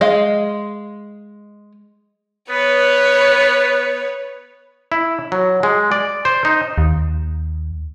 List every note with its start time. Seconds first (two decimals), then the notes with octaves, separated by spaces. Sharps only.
0.01 G#3 D#5 F5
2.50 B3 B4 C#5
4.92 E4
5.32 F#3
5.63 G#3
5.92 D5
6.25 C5
6.45 D#4
6.78 D#2